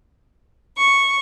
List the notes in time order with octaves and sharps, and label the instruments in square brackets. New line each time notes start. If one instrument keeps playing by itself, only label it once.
[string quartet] C#6